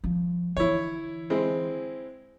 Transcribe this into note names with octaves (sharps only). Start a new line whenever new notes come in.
F3 G3
D3 E3 E4 C#5
G#3 C4 E4